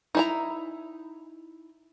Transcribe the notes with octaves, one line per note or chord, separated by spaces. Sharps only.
D#4 E4 A#5